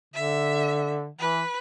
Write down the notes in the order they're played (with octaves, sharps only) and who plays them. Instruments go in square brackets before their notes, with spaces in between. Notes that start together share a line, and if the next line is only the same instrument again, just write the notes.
[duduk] D3 [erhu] E5
[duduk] E3 [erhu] B4